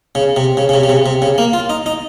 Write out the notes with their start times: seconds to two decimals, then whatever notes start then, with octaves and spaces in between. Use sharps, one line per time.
0.15 C#3
0.36 C3
0.57 C#3
0.69 C#3
0.74 C3
0.84 C#3
0.89 C3
1.06 C3
1.22 C#3
1.38 A#3
1.53 F4
1.70 D#4
1.86 D#4